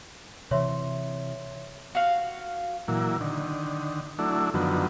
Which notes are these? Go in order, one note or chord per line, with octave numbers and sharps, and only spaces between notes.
C3 E3 C#5 E5 C6
F#4 F5
A#2 E3 F#3
D3 D#3
F#3 A3 D4 E4
F#2 D3 D#3 F3 F#3 B3